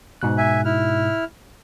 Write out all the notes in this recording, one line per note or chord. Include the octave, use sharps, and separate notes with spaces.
G#2 B2 F#6
E5 G#5
E4 F6